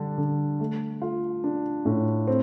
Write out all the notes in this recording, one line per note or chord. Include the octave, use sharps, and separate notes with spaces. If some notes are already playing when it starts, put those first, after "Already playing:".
Already playing: D3 G3 D4
D3
A3
F4
D4
A2
C4